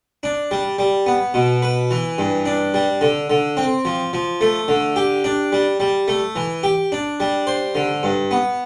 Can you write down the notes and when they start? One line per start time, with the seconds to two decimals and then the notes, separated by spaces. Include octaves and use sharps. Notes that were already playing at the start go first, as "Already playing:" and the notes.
0.23 D4
0.51 G3
0.79 G3
1.06 B3
1.34 B2
1.62 B4
1.91 E3
2.18 G2
2.46 D4
2.74 G3
3.01 D3
3.30 D3
3.57 C4
3.85 F3
4.13 F3
4.41 A3
4.68 D3
4.96 G4
5.24 D4
5.52 G3
5.80 G3
6.08 A3
6.36 E3
6.63 G4
6.92 D4
7.20 G3
7.47 C5
7.75 D3
8.03 G2
8.31 B3